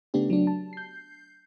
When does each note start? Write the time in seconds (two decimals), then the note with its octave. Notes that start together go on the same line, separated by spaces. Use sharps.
0.14 C#3 A3 B3 D4 G4
0.30 F#3 D4
0.47 A5
0.73 G6 C7